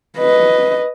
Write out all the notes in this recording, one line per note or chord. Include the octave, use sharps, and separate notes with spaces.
B4 D#5